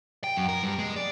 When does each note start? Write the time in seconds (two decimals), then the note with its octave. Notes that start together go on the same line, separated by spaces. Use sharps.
0.24 G5
0.36 F#2
0.49 A#4
0.63 G2
0.79 G#3
0.96 D5